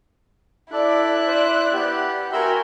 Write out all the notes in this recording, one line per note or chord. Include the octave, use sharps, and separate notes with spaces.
E4 A4 D5 F#6
C5
B3 G4
F#4 A#4 E5 G5 G#5 B5 C6